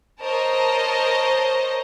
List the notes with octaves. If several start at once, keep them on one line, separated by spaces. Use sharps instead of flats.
A#4 C5 C#5 D#5 A5 A#5